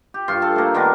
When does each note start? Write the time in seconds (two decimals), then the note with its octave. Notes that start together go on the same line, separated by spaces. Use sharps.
0.14 G4
0.28 G2 F4 C6 C#6
0.42 A4
0.56 A3 A#3
0.74 D#3 B3 D4 A#4